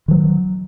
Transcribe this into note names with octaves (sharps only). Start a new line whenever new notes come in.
D#3 F#3